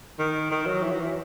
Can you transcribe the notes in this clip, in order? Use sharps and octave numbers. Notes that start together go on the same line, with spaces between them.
D#3
D#3
F#3
E3
F#3
E3